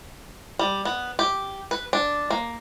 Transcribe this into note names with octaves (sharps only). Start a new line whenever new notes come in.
G3
B3
G4
B4
D4
A#3